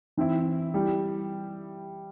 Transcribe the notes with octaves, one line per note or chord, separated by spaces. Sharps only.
E3 C4 E4
G3 E4 G4